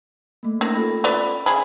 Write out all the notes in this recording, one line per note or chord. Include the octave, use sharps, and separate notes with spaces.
A3 A#3
D#3 C#4 A#6
F4 A4 B5
B3 B4 D5
C#3 G#4 B5